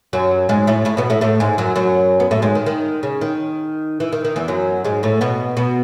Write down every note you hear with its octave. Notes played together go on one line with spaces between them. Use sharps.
F#2 F#3
G#2 G#3
A2 A3
A2 A3
B2 B3
A2 A3
A2 A3
G#2 G#3
F#2 F#3
F#2 F#3
B3
A2 A3
G#2 G#3
D#3
D#3
C#3
D#3
E3
D#3
D#3
E2 E3
F#2 F#3
G#2 G#3
A2 A3
B2 B3
B2 B3